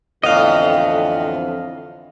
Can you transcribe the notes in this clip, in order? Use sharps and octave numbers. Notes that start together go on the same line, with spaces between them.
F2 A2 D3 E3 B3 D#5 F5